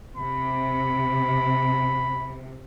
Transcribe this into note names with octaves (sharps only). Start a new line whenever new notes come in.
C3 B5